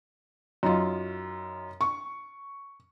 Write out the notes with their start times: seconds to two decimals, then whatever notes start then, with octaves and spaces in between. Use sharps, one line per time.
0.63 F#2 D#4 F4
1.81 C#6